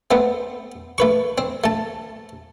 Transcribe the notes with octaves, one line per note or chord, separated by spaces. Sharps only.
A3 B3 C4
A3 B4 C#6
C4
A3 A5